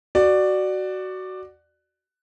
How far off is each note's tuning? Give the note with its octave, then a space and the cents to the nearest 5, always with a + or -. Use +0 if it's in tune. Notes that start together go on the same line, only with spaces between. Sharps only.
F#4 +15 D5 +15